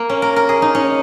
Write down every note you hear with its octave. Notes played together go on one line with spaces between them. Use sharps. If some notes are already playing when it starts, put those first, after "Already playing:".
Already playing: A#3
C#4
A#4
A#4
G#4
D#4
C#4